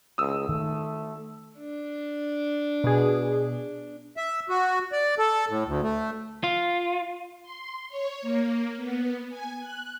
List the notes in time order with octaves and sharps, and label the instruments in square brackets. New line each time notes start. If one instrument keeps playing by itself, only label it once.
[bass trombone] C#2 [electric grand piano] D#6 E6
[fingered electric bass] D#3 [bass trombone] A3
[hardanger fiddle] D4
[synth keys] B2 G#4
[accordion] E5
F#4
D5
A4
A2
D2
A3
[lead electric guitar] F4
[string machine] C6
C#5
A#3
B3
G#5
F#6